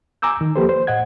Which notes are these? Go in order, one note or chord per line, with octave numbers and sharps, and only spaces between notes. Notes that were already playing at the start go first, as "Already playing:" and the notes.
G#5 A#5 D6 E6 G6
D#3
F3 A#3 G4 A4 B4 C5
C5
A2 D#5 F#5 G#6